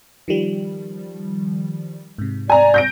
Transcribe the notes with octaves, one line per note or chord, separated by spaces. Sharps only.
D#3 F3 G3
G#2 C3
D5 G#5 A#5
G6 A#6 D7